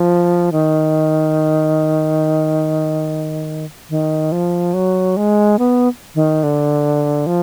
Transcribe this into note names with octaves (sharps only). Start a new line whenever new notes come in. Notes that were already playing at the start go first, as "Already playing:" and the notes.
Already playing: F3
D#3
D#3
F3
F#3
G#3
B3
D#3
D3
F3